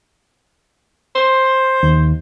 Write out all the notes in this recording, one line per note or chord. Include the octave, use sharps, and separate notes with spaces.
C5
D#2